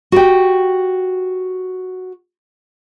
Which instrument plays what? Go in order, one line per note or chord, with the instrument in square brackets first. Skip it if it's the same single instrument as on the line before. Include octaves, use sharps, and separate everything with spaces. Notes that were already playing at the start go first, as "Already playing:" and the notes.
[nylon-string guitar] F#4 G4 G5